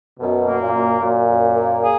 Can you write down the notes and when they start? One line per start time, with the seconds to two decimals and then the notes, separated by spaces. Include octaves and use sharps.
0.20 F#2 B2
0.46 A#3
0.60 A#2
0.73 F#2
1.00 F#2 A#2
1.29 F#2
1.56 A#3
1.83 G#4